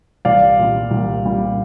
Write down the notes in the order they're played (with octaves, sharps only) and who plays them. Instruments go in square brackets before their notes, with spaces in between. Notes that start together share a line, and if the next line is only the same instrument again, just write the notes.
[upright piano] C2 D5 F5
A#2 G3
C2
A#2 G3